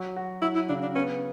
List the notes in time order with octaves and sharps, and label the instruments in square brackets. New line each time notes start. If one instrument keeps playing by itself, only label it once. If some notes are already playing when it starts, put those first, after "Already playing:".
Already playing: [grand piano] F#3
F#4
[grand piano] F#3 [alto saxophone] E4
[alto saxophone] E4
[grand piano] C#3 [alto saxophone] D4
[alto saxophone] D4
[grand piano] B3 [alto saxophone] C#4